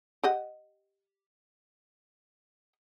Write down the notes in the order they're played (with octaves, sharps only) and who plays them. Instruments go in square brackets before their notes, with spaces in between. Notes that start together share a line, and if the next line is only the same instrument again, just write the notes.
[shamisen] G4 D#5 F#5